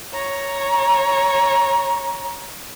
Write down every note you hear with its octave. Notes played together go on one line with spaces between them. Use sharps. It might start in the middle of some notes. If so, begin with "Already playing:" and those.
C#5 A#5